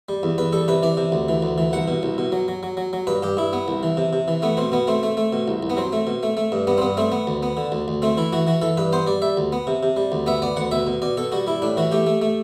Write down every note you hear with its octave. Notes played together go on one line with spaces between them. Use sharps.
G3
E2
E2 B4
G3 A4
C3 B4
E3 D5
C3
D2
E3
D2
E3
C2 F#5
B2
C2
B2
F#3
F#3
F#3
F#3
F#3
G2 B4
G2 G4
G2 E4
B3
C2
E3
C3
C3
E3
A3 B3
B2 C4
B2 B3
A3 C4
A3
A3
B2
C2
C2
B3
F#3 C4
A3
B2
A3
A3
G2
G2 B3
C4
G2 B3
A3 C4
B3
D2
B3
D3
D2
D2
A3 C4
E3 E4
E3 F#4
E3 F#4
E3 A4
G2 B4
B3 C5
G3 D5
G3 E5
D2
B3
C3
C3
G3
D2
B3 E5
B3 D5
D2 F#5
B2 E5
B2
B2 D5
B2 A4
G3 F#4
G3 E4
A2 D4
E3 F#4
A3 G4
A3
A3